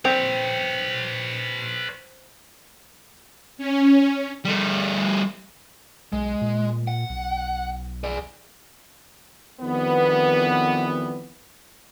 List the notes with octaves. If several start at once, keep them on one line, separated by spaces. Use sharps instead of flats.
C4 B4 C#5
C#4
G3 A3
B1 G#3
A#2
F#5
B1
G#4 D5
F2 D#3 E3 G3 B3